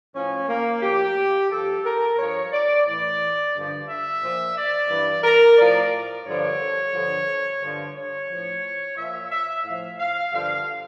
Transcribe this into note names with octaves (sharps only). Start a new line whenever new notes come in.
A2 F3 C#4
A#3
A2 F3 G4
G2 F3 A4
A#4
G2 F3 C#5
D5
A2 E3 D5
G2 D3 F3
E5
A#2 F3
D5
G2 E3
A#4
A2 F3 D5
G2 D3 F3 C#5
G2 D3 F3
G2 D3 F3
C#5
A2 F3
A#2 F3 E5
E5
A2 F3 F5
F5
G2 D3 F3 F5